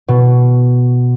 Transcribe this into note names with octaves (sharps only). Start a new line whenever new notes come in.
B2